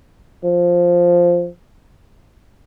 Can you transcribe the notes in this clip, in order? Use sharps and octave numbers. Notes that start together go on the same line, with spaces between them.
F3